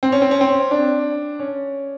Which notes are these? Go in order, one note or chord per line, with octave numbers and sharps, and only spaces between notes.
C4
C#4
C4
C#4
C4
D4
C#4